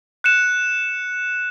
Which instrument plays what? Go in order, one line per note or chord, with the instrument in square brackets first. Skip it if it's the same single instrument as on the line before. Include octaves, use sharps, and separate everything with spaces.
[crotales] F#6 C#7 E7